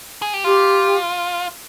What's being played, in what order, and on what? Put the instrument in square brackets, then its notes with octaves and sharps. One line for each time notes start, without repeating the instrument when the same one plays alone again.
[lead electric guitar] G#4
G4
[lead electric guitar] F4 [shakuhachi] G4